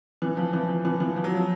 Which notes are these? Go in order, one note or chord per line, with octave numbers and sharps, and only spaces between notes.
E3
F3
E3
F3
E3
E3
F3
F#3
F3